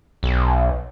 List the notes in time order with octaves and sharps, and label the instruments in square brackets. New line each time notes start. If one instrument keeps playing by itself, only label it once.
[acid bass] B1